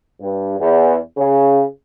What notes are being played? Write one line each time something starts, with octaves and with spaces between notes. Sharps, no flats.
G2
E2
C#3